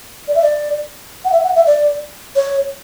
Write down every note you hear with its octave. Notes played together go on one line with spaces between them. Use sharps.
D5
E5
D5
F#5
E5
F#5
E5
D5
C#5